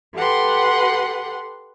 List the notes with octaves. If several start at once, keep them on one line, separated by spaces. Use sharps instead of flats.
G4 A4 B4 F#5 C6